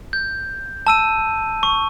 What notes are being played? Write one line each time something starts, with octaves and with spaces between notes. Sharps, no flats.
G6
A5 E6 D#7
C#6